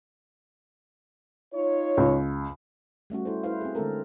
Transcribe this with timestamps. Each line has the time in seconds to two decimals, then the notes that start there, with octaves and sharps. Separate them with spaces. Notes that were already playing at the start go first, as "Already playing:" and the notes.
1.53 D#4 F4 C#5
1.97 C#2
3.10 G3 A3 C#4 F#4
3.25 E4 A4 C5
3.43 E4 B4 C5 F5
3.61 C4 G#4
3.75 D3 G#3 A3 C4 A4 A#4